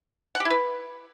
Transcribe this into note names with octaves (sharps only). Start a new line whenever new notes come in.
F#5
G4
E4
B4